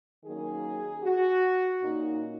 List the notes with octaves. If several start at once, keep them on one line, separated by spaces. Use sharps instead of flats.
D#3 F#3 A#3 C#4 G#4
F#4
A#2 A#3 C#4 D#4